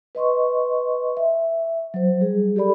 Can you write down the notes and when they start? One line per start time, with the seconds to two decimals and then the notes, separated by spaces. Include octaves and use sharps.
0.15 B4 D#5 C6 C#6
1.17 E5
1.94 F#3 C5
2.20 G3 G#4
2.56 G4 A4 D5 B5